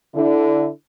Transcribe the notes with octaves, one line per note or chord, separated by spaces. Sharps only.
D3 E4